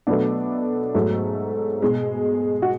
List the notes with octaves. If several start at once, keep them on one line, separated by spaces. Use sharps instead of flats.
B2 F#3 A3 B3 D4
G#2 F#3 A3
B2 G#3
F#4